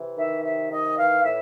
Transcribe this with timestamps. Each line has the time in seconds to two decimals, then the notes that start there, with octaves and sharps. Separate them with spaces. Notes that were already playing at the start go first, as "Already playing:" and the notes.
Already playing: C3 E3
0.17 D#3 E5
0.44 C3 E5
0.70 D#3 D#5
0.97 E3 F5
1.24 A2 E5